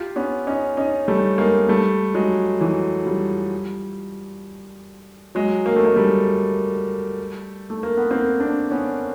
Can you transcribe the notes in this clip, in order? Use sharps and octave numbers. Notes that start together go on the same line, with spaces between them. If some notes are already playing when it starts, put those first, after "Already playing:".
Already playing: F4 G4
B3 C#4
C#4 D#4
C#4 D#4
G3 A3
G#3 A#3
G3 A3
F#3 G#3
E3 F#3
F3 G3
F#3 G#3
A#3
A3
G#3 A#3
G3 A3
A3
A#3
B3
A#3 C4
C4 D4
B3 C#4